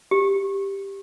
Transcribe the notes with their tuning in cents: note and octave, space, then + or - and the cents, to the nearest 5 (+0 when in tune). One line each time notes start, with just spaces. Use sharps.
G4 +5